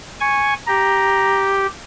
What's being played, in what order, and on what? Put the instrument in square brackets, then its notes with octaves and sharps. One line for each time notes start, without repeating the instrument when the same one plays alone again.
[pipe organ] G#5 C#6
[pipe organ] G4 [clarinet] A#5